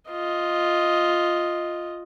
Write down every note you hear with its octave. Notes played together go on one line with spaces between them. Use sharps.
F4 D#5